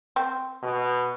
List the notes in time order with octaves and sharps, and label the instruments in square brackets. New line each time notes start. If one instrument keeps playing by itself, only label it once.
[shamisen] C4
[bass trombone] B2